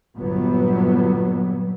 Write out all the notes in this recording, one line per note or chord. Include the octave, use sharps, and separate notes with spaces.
G1 A#2 F#3 G3 B3